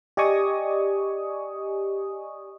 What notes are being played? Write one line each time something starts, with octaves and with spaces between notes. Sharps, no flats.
G4 D5 D#5 G#5 C#6 D#6